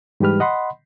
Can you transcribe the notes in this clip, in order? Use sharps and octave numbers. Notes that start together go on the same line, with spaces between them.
G#2 E3 G3 G4 B4 F6
D#5 F#5 B5 C6